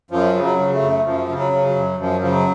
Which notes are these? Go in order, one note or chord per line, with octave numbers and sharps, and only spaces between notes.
F#2 F3
C#3
F#3
C#3
A3
F#2
F#2 F3
C#3
F#3
C#3
F#3
F#2
F#2 F3
C#3 F3
F#3